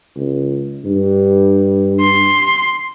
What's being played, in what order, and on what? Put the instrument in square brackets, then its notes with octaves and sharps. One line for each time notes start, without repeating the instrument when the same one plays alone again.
[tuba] C#2
G2
[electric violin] C6